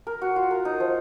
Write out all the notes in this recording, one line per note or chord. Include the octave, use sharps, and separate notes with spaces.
A#4
F#4
F4
A#4
D#4
F3